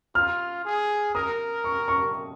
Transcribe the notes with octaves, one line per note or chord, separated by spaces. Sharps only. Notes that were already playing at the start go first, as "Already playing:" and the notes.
F4 F6
G#4
A#4 D#6
C#6
C#6